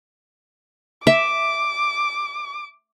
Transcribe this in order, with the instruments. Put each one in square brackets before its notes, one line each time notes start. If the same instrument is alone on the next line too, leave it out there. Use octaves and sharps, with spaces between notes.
[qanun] E5 [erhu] D6